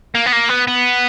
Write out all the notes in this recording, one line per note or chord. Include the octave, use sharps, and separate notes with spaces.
A#3
B3
A#3
B3
B3